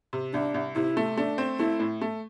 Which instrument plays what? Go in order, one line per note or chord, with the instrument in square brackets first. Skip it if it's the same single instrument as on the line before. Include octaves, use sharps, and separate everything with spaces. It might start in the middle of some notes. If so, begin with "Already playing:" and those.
[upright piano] C3
[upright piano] C2 [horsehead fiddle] D4
[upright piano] C2
[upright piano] C3 [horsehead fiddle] E4
[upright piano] A3
[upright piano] A3 [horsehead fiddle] D4
[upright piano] C4
[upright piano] A3 [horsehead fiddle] E4
[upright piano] A2
A3